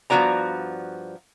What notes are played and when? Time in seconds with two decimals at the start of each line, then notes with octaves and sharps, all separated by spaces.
0.10 G2 F3 B3 F#4 D5 A#5